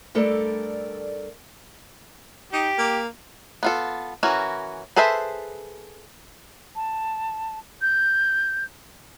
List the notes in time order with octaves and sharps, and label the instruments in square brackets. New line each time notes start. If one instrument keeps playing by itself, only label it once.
[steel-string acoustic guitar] G2 A3 A4 A#4 D5
[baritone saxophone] D#4 [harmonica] G4
[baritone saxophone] A#3
[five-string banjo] B3 F4 A4
E3 C#4 F#4 A#4
G#4 A4 B4 C5 E5
[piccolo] A5
G6